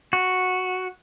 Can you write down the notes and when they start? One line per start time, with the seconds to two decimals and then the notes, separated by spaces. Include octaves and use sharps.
0.13 F#4